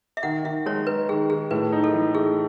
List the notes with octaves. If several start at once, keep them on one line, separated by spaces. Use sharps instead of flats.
E5
D#3 F#5
D#3 E5
G#3 C#5
D#4 B4
D#3 G#4
D#3 G#4
A2 B4
D#4
A4
E3
A3 G#4